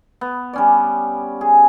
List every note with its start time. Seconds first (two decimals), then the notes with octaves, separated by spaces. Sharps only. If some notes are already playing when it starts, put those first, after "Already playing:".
0.21 B3
0.53 G3 C#4 D5
1.41 G#4